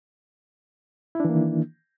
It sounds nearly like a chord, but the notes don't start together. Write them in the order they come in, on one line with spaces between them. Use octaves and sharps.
E4 D4 E3 A#3 D#3